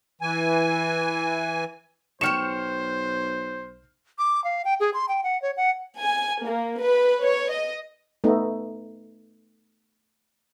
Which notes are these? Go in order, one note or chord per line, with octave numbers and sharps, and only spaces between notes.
E3 G#5
B1 C5 C#5 G5 C#6 F6 C#7 E7
D6
F5
G5
G#4
C6
G5
F#5
C#5
F#5
G#5
A#3
B4
C#5
D#5
A3 B3 D#4